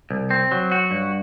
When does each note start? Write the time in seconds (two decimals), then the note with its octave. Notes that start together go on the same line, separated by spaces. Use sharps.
0.11 C2
0.30 C4
0.52 F#3
0.72 F#4
0.91 G2